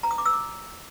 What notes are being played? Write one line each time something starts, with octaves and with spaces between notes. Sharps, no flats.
A#5
D#6
D6
E6
D6